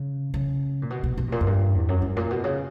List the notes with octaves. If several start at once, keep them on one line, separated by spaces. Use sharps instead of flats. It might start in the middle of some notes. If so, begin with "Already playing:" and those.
Already playing: C#3
C#3
A#2
B2
B2
B2
G2
A#2
F#2
G2
E2
F#2
G2
A#2
B2
C#3